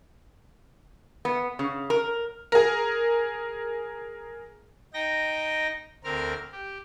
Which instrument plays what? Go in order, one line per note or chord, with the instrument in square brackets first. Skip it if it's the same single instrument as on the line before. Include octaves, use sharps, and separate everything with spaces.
[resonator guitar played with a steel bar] B3
C#3
A#4
[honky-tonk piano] G#4 A#4
[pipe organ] D#4 G5 A#6
D2 C4 A#4 F6
G4